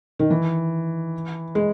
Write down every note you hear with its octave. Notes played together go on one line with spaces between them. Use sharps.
D#3
E3
G#3